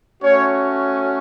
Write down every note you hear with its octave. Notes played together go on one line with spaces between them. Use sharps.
A3 C#4 F#4 C#5